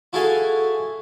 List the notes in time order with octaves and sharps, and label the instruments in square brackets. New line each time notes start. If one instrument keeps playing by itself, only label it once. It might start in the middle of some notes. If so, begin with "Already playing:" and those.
[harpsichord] E4 F#4 G#4 A4 F5 G#5